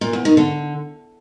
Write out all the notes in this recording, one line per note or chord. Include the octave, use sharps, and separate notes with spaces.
A#2
E2
D#3
D3